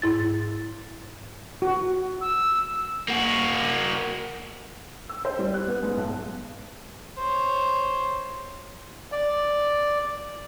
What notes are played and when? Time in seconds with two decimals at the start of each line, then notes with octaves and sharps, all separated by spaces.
0.02 G#2 E4 A6
1.62 F#4
2.21 E6
3.08 A#3 F#4
5.09 E6
5.25 C5
5.39 G3
5.54 F#6
5.68 B3
5.83 G#2
5.97 B1
7.18 C5 C#5
9.12 D5